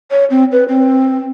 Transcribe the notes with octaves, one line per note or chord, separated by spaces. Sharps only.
C#5
C4
B4
C4